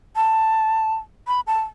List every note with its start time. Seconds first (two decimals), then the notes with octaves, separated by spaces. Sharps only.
0.16 A5
1.27 B5
1.47 A5